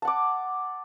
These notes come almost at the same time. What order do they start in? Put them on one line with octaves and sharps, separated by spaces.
A5 F#5 D6